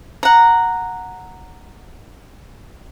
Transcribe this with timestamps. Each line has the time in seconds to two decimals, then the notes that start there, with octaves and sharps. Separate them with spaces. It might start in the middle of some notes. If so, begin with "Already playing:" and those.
0.23 F#5 A#5